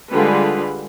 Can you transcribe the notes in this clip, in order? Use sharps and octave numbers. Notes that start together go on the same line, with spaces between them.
D3 G3 G#3 F4 G#4 B4